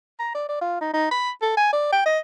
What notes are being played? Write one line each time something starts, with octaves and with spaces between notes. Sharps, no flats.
A#5
D5
D5
F4
D#4
D#4
B5
A4
G#5
D5
G5
D#5